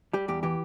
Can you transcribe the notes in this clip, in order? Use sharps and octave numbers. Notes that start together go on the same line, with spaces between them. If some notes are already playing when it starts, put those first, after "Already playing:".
G3 G4
E2 G4
E3 G4